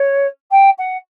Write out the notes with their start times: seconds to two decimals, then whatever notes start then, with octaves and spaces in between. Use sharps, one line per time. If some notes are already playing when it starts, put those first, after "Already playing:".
Already playing: C#5
0.51 G5
0.78 F#5